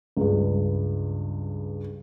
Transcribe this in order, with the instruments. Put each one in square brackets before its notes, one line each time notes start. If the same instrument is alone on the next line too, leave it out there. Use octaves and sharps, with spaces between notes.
[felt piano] C#2 G2